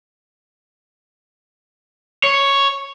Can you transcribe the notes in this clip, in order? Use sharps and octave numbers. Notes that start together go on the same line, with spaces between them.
C#5